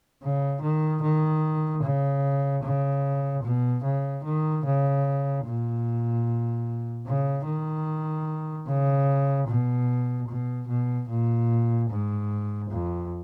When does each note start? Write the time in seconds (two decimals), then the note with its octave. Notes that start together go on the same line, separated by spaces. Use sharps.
0.23 C#3
0.62 D#3
1.03 D#3
1.83 C#3
2.63 C#3
3.44 B2
3.84 C#3
4.25 D#3
4.66 C#3
5.45 A#2
7.06 C#3
7.47 D#3
8.67 C#3
9.48 B2
10.29 B2
10.68 B2
11.10 A#2
11.89 G#2
12.71 F2